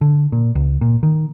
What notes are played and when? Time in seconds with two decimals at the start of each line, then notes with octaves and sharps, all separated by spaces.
0.01 D3
0.32 A#2
0.55 C#2
0.81 A#2
1.03 D#3